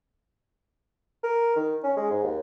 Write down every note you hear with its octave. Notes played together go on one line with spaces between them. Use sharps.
A#4
D#3
C#4
G#3
G#2
D#2